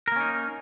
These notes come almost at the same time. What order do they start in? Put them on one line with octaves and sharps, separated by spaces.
A#4 A#3 C#4 D#4